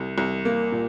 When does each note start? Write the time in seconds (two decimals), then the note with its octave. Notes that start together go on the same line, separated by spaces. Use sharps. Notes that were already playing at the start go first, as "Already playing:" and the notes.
Already playing: C2
0.18 C2
0.45 A#3
0.72 A#2